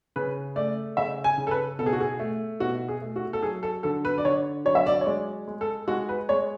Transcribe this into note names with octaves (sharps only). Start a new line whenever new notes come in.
C#3 B4
A3 D5
C#3 E5
G#5
C#3
A4
B4
B2 A4
G#4
F#4
G#4
A3
B2 F#4
G#4
A3
F#4
A4
F#3 G#4
A4
D3 A4
B4
D5
D3 C#5
F#3 C#5
E5
D5
C#5
G#3 D5
G#3
A4
G#3 F#4
B4
G#3 C#5